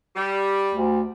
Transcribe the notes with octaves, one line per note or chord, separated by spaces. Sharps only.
G3
D2